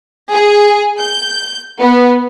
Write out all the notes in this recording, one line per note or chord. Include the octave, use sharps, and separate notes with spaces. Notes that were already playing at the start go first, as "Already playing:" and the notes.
G#4
G6
B3